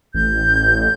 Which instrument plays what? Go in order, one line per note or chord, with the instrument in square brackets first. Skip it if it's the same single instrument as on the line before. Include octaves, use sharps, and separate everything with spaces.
[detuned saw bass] A1 [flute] G6